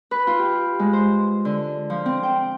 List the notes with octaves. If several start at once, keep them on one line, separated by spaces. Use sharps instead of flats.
B4
F4
G4
G#3
C5
D3
F3
C4
G5